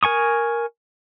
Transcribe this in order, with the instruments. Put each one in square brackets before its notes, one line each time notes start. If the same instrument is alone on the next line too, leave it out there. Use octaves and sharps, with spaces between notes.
[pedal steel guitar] A#4 G#5 C#6 D#6